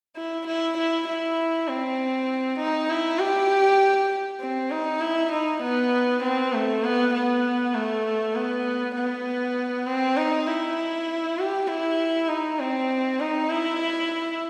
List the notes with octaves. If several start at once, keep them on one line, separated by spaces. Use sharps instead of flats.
E4
E4
E4
E4
C4
D#4
E4
G4
C4
D#4
E4
D#4
B3
C4
A3
B3
B3
A3
B3
B3
C4
D#4
E4
G4
E4
D#4
C4
D#4
E4